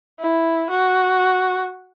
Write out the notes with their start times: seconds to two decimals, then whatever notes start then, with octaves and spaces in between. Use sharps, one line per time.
0.20 E4
0.70 F#4